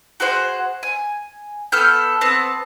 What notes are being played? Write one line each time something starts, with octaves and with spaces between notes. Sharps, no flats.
F#4 G#4 C5 F#5
G#5
B3 A4 F6 G6
B3 C4 A5